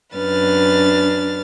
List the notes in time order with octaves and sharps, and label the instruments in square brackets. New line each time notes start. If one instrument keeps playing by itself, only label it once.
[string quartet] F#2 D4 B4 F6 A6